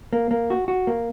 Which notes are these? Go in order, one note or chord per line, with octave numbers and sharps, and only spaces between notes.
A#3
A#3
F#4
F#4
A#3